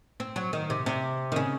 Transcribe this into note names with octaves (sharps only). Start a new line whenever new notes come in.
C4
F#3
D#3
C3
C3
D#3
C#3